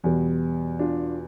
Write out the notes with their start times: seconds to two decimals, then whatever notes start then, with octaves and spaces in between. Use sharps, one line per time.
0.04 E2 B2 G3 B3
0.79 D4 F4